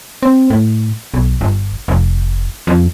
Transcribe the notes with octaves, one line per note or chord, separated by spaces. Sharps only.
C4
A2
B1
G1
F1
F2